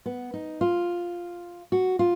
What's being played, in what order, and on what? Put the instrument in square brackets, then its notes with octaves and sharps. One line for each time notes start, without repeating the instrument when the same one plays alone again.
[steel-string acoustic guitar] B3
D#4
F4
F#4
F4